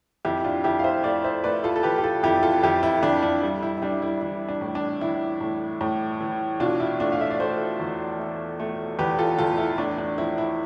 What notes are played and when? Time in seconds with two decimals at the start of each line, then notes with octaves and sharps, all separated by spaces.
0.25 F2 E4 G4
0.44 D4 F4
0.64 F2 E4 G4
0.79 F5
0.84 C5 E5
1.04 A3 D5 F5
1.24 C5 E5
1.44 A3 B4 D5
1.64 F4 A4
1.76 A4
1.83 E3 G4 B4
1.98 G4
2.03 F4 A4
2.23 F2 E4 G4
2.43 F4 A4
2.63 F2 E4 G4
2.83 E4
3.03 F2 D4
3.23 D4
3.43 G3
3.63 E4
3.78 E4
3.82 G3 D4
4.02 E4
4.21 E3 E4
4.49 D4
4.61 A2
4.75 D4
5.01 E3 E4
5.41 A2
5.81 A2
6.21 E3
6.60 B2 D4 F4
6.80 E4
7.00 A3 D4 F4
7.12 F5
7.21 E5
7.31 D5
7.40 A3 A4 C5
7.79 E2
8.19 A3
8.60 A3
8.99 E2 G4 B4
9.19 F4 A4
9.38 E2 F4 A4
9.58 E4
9.78 A2 D4
9.98 D4
10.18 F3 E4
10.38 E4